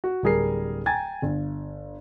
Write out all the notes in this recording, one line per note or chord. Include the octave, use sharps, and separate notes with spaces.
F#4
D1 G3 G#4 A#4 C7
G5 G#5 A#5 G#6 A6
G1